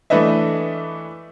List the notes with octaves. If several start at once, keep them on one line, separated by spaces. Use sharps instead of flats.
E3 A3 D4 B4 D#5 E5